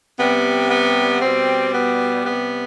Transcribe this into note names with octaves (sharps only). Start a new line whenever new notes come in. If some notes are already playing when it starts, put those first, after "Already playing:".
C3 G3 B3
B3
B2 G3 C4
B3
C3 G3 B3